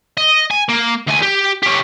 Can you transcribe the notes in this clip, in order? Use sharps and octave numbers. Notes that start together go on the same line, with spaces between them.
D#5
G#5
A#3
D2 G#5
G4
C#4 G4